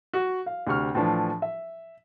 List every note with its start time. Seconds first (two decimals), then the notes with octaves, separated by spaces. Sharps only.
0.14 F#4
0.46 F5
0.67 D2 C3 C#6 F6
0.95 A2 E3 F3 D4
1.42 E5